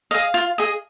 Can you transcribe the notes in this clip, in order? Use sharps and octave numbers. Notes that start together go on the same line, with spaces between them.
G#4 D#5 F5
F4
G#4 D#5